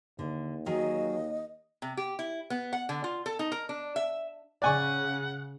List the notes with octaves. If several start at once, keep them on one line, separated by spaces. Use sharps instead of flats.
D#2 D3
D#3 F#3 G#4 D#5
C3
G4
E4
B3
F#5
D3
F4
A4
D#4
A#4
D4
E5
C#3 D5 F#5 G#5 C#6